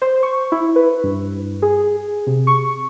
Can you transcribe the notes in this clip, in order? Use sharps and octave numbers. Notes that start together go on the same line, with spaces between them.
C5
C#6
E4
B4
G2
G#4
C3
C#6